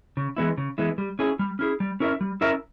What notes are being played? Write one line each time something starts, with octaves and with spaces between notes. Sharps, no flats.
C#3
E3 G#3 B3 E4
C#3
E3 G#3 B3 E4
G3
C#4 E4 G#4
G3
C#4 E4 G#4
G3
C#4 E4 A#4 E5
G3
C#4 E4 A#4 E5